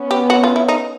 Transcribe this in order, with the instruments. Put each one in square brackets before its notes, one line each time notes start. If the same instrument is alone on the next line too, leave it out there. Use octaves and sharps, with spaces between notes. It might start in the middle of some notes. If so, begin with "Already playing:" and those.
Already playing: [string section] B3 C#4
[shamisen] G4
F#4
F4
E4
D#4